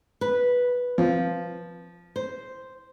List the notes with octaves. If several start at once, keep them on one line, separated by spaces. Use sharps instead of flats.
B4
F3
C5